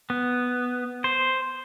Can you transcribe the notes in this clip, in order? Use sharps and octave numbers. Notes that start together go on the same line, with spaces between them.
B3
C5